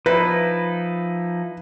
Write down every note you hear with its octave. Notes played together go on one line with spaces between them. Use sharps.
F3 D#4 E4 B4